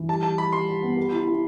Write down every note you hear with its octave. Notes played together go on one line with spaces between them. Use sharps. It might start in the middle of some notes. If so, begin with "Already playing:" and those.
Already playing: E3
G3 A5
G3 A5
G3 B5
G3 C6
G3
B3
G4
E4
E4